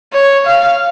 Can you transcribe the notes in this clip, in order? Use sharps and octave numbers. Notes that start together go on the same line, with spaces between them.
C#5
F5